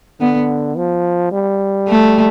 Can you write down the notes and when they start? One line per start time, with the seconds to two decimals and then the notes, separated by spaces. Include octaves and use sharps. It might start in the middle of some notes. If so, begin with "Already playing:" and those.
0.20 D3 B3
0.77 F3
1.32 G3
1.88 A3